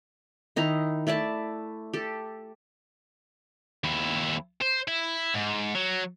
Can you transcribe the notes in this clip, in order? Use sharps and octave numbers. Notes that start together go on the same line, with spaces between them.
D#3 D#4 E4 A#5
A3 E4 D5 A5
G4 A4
D#2 E4
C5
E4
G#2
F#3